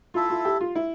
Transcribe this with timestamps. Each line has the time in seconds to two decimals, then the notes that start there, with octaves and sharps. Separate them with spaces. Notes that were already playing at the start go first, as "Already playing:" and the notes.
0.14 E4 F4 A4 E5
0.30 F4
0.45 G4
0.61 F4
0.75 E4